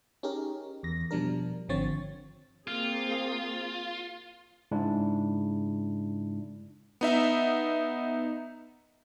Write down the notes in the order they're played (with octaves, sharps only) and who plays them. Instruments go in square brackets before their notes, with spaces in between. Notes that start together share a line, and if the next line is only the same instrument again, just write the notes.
[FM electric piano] C#4 D#4 G4 G#4 A#4
E2 A#6
B2 F3 G3 D4 A#4
G#1 D3 F3 C4 C#5 A6
[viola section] A#3 C4 G#4 [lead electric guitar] F4
[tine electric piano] G#2 C#3 G#3 D4 E4
[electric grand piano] B3 D#4 E5